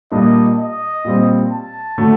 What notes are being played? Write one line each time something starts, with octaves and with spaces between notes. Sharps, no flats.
A#2 G3 A#3 D4 D#5
D#5
A#2 G3 C4
A5
D3 F#3 A3